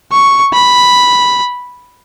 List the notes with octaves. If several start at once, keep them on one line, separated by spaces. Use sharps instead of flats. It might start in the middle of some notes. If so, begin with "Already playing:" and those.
C#6
B5